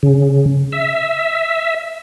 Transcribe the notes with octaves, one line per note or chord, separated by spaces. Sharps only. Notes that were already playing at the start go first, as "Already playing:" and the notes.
C#3
E5